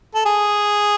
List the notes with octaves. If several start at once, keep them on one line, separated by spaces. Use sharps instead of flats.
A4
G#4